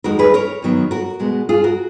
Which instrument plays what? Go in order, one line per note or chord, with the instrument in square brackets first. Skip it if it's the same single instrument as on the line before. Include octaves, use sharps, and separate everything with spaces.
[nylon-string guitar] F2 D#3 G#3 F#4 A#4
G#4 B4
A#4 C#5
F#2 D#3 F#3 B3
F#4 A#4
B2 G#3 B3
F4 G#4
F#4 A#4